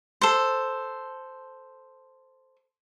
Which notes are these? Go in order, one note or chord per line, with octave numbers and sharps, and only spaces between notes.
A4 C5